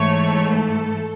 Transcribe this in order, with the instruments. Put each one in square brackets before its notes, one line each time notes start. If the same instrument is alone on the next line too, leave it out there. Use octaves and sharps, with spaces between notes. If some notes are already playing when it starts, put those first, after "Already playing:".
Already playing: [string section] G#2 E3 A3 C#5
A4